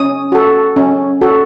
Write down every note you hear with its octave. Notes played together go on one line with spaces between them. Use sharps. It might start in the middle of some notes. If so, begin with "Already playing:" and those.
Already playing: C#4 D#6
F#4 A4
C#4
F#4 A4